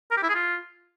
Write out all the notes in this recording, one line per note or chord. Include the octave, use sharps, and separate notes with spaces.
A#4
G4
E4
G#4
F4